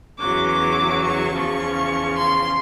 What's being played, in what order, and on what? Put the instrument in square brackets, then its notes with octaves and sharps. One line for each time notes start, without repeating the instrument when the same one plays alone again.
[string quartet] E2 C#3 F#3 D6
D6
C#6
E2 C#3 F3
C6